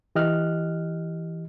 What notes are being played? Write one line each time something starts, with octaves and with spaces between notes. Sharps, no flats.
E3 G4 D#5 F6 F#6